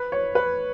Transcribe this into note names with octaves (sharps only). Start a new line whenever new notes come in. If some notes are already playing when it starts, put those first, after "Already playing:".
Already playing: B4
C#5
B4